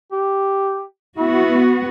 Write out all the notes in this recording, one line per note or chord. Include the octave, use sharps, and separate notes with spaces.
G4
B3 E4 F#4